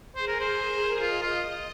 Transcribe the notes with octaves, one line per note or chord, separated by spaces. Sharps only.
G#4 C5
A#4
C5
A#4
F4 D#5
F4